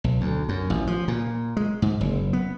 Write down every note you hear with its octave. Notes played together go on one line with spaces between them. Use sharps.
B1
D2
F#2
A1
F3
A#2
G#3
G#2
F#1
B3